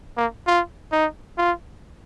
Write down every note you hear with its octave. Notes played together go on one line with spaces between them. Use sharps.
A#3
F4
D#4
F4